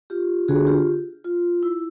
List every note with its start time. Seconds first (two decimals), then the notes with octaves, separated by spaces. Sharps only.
0.10 F4 G4
0.48 D3 F#4 G#4
0.67 F4 G4
1.24 F4
1.63 E4